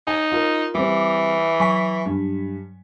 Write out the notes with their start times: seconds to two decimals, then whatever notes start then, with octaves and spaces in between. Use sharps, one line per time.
0.07 D#4 G#5
0.32 F4 A#4
0.75 E3 G3 C4 D6
1.60 F#3 G#5 C#6 B6
2.06 G2